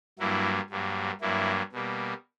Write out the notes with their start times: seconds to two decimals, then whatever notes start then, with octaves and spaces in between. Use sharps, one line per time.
0.19 G2 F#3 A#3 E4
0.70 G2 F#3 A#3
1.21 G2 F#3 A#3 E4
1.73 B2 G3 A#3